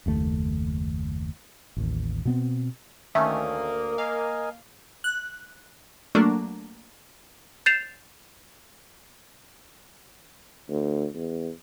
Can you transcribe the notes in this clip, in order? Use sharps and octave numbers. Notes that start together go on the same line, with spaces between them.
F#1 D#2 A3
A1 D#2
B2 B3 C4
D2 D#3 A3 A#3 C#4 E5 D#6
A#4 D#5 F5 G#5
F#6
F#3 A3 A#3 D4
G6 A6 C7 E7 F7
D2
E2